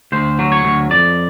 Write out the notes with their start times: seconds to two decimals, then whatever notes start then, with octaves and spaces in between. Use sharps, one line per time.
0.12 D2 C5
0.39 F#3
0.52 C#5
0.65 D2
0.90 F2 D5